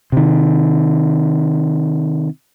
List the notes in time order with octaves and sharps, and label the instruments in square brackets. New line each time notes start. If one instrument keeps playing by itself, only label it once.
[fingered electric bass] C3 D#3